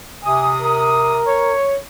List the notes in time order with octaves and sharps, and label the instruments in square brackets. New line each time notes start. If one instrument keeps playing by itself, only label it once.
[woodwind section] C3 D#6 [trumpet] G#5
[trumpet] A#4
[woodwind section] C#5